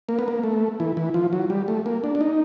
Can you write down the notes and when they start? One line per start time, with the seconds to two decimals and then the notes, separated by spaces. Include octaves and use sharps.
0.09 A#3
0.19 B3
0.28 A#3
0.43 A3
0.80 E3
0.97 E3
1.14 F3
1.33 F#3
1.50 G3
1.68 A3
1.86 A#3
2.04 D4
2.15 D4
2.21 D#4